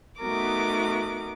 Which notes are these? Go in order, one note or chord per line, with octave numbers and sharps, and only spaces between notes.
A3 B3 D#4 F#4 A#4 D6